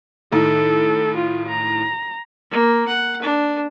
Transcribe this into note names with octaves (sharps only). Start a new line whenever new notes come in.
A2 D#3 A4
F4
A#5
A#3
F#5
D4